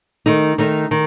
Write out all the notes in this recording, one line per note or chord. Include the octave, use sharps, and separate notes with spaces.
D#3 A3 D#4
D#3 A3 D#4
D#3